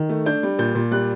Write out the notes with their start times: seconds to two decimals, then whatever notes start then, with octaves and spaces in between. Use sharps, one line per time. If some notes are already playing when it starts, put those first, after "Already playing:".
Already playing: D#3
0.09 A3
0.26 D4 G6
0.43 G3
0.59 A#2 G6
0.75 A#2
0.91 G3 F#6